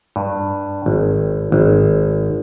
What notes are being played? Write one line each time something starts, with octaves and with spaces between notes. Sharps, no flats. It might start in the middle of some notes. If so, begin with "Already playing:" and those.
G2
G#1
G#1